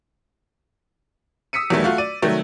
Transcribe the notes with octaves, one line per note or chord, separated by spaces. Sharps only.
D#6 E6 B6 C#7 D#7
E2 D#3 F#3 G3 A3 B3
A3 F4 F#4
D5 D#7
C3 D#3 F#3 G3 A3